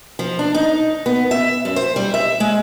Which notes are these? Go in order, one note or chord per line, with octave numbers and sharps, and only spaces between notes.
F3
D4
D#4
B3
E5
F#2
C5
G3
E5
G#3